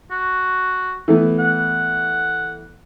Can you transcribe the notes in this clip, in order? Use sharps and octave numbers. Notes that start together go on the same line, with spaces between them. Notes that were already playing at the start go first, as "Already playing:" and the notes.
F#4
E3 A3 B3
F#5